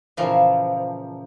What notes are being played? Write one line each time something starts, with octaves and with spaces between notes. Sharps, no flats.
A#2 C#3 E3 F3